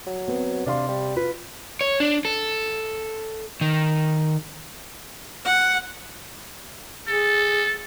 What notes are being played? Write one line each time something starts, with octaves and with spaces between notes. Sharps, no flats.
F#3
B3 C4
C3 D4 F5 C6
G3
F4 B4
C#5
D4
A4
D#3
F#5
G#4 A4